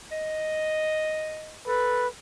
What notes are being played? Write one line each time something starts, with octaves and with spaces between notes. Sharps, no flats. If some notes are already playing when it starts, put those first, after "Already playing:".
D#5
A4 B4